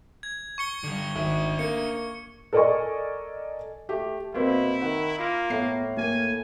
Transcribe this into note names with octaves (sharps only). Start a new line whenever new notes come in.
G#6
C#6 C#7 G7
D3 G3
G#1 D4 E5
A#3 C#7
A4 A#4 D5 D#5 G#5 C#6
A3 G4
B2 A#3 C4 E4
D#3 F#5
A#3 F4
A2 B3 C7
A#3 A#4 G#5